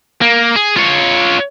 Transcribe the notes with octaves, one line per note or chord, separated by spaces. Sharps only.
A#3
G#4
F4 C#5